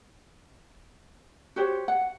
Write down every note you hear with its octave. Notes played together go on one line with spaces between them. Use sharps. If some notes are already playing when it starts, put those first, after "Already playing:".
F#4 G4 C5 C#5
F#5